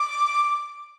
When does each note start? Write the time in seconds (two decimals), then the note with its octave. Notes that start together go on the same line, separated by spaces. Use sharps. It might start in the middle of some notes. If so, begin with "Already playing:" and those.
Already playing: D6
0.44 D6